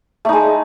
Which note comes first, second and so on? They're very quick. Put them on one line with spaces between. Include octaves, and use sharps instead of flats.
A3 D#4 G#3